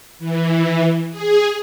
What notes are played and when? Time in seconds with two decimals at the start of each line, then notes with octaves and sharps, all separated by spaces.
0.19 E3
1.11 G#4